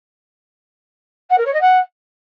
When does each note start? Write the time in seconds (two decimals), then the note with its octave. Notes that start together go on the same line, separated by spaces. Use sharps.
1.30 F#5
1.37 A#4
1.45 C#5
1.53 D#5
1.60 F#5